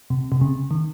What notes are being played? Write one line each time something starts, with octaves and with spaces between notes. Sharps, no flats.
C3
C3
C#3
D#3